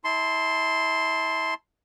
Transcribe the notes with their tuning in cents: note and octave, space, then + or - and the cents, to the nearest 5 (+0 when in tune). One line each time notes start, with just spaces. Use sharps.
E4 -35 A5 -10 C6 +0